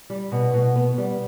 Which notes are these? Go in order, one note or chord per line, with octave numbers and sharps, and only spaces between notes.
G3
B2
B2
B3
G3